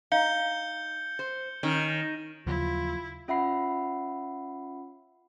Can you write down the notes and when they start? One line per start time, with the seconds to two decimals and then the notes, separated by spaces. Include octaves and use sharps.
0.12 D#4 F5 G6 C#7 G7
1.19 C5
1.63 D#3 C#4
2.46 D#2 C#3 F3 F#3 E4 F4
3.28 C#4 F4 E5 F#5 B5 C7